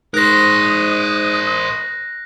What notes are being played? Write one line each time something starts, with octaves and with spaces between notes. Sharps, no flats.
G#2 A#4 C5 D#6 F#6 A#6